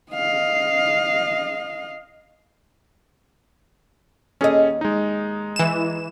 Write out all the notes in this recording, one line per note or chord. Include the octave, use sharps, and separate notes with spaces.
D#5 F5
D#2 C#4 G#4 A4 D#5
G#3 D#4
E3 E7